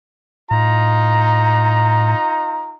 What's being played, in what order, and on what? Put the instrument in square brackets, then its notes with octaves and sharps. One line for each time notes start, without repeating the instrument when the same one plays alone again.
[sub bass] A2 [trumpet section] D#4 F4 A#5